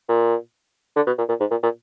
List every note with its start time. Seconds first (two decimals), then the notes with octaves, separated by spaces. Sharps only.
0.09 A#2
0.96 D3
1.07 B2
1.18 A#2
1.29 A#2
1.40 G#2
1.51 A#2
1.63 A#2